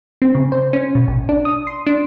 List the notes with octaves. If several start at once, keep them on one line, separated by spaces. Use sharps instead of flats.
C4
C#3
C5
C#4
B2
A1
D4
D#6
C6
D4